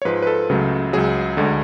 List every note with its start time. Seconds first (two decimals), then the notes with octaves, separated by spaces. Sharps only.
0.02 C#5
0.05 G#2 F3 G#3 B4
0.22 B4
0.27 A4
0.49 C#2 C#3 F#3 A3
0.93 C#2 C#3 F#3 G#4
1.37 D2 D3 G#3